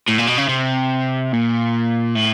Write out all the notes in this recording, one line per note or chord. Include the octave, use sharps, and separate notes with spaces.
A2
A#2
B2
C#3
C3
A#2
A2